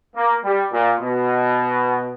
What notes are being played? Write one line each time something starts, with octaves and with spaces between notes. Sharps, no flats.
A#3
G3
A#2
B2